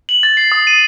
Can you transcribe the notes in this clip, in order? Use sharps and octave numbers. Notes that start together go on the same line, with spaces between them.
F#7
A6
C7
D#6
D#7